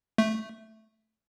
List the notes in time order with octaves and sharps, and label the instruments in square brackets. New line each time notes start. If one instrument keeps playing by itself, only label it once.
[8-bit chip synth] A3